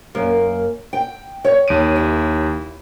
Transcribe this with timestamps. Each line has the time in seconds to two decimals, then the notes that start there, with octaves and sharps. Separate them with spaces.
0.15 F#2 A#3
0.93 G5
1.45 C#5
1.68 D#2 D7 D#7
1.96 E4